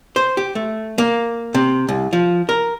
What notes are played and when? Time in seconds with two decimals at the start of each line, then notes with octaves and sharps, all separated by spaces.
0.16 C5
0.37 G4
0.55 A3
0.98 A#3
1.54 C3
1.89 C2
2.13 F3
2.49 A#4